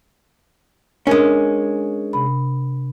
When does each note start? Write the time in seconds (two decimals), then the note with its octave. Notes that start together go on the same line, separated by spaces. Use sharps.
1.07 G#3 C#4 D4 A#4
2.13 C3 B5